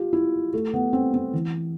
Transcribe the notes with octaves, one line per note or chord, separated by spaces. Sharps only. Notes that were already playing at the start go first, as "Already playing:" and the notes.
Already playing: F4 G4
E4
A3
B3
C4
C4
E3